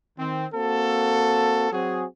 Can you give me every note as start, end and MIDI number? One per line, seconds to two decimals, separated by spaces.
0.19 0.47 51
0.19 0.47 60
0.53 1.71 58
0.53 1.71 60
0.53 1.71 66
0.53 1.71 69
1.72 2.06 54
1.72 2.06 60
1.72 2.06 66
1.72 2.06 68